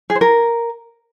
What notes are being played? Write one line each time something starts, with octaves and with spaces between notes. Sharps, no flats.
G#4
C5
A#4